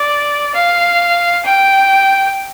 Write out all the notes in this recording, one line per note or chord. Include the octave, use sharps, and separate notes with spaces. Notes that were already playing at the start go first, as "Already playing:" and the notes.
Already playing: D5
F5
G5